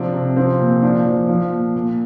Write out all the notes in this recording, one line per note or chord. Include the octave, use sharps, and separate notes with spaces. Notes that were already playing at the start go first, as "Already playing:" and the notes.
Already playing: C3 F3 D4
C3
F3 C4
A#2
F3 D4
F3
F3
A#2
A#2